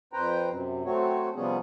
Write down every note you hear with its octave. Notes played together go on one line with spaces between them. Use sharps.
F2 B4 C5 G5 A#5
F#2 C3
F#3 A3 C4 F#4 C#5
C3 F3 G3 B3 C#4 G#4